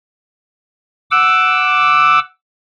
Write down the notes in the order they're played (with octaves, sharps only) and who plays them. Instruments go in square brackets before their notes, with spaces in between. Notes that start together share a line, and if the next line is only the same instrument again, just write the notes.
[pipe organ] F#5 D6 E6